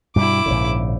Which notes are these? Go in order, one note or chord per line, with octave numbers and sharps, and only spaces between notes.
G2 B2 G3 E4 D6
A#1 G#2 C#3